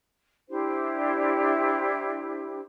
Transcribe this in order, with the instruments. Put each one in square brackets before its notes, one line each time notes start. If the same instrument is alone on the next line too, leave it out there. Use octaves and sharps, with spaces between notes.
[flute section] D4 E4 G4 C5